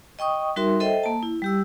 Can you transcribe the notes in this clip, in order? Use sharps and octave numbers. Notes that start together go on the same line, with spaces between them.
D#5 G5 C#6 D#6
G3 D#4 F#4 A#4 E5 C6
A4 C5 D#5 E5 G5
A#3 A5
E4
G3 G4 E6